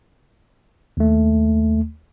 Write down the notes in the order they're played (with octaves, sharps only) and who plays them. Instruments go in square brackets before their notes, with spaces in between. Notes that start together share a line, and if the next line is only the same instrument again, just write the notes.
[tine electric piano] D#2 A3